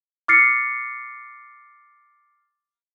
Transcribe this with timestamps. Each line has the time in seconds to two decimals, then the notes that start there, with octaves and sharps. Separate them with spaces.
0.28 D6 F6 A6 C7 C#7